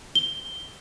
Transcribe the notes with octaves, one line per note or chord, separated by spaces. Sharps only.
G7